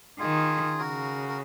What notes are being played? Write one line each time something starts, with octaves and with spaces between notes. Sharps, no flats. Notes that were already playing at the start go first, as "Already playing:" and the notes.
D#3 F4 G#4
C#3 F#4 A#4
A#4